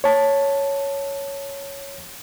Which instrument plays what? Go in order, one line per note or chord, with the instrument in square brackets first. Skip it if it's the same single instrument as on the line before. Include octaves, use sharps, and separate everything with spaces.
[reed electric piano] C#5 A5